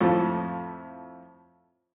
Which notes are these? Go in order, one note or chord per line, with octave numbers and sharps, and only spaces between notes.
F2 A2 F3 A3